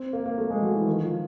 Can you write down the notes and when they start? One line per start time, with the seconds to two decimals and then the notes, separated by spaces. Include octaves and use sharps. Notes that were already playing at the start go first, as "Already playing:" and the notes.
Already playing: C4
0.13 A#3
0.26 A#3
0.38 A3
0.50 G#3
0.62 F#3
0.75 E3
0.87 D#3
1.03 F3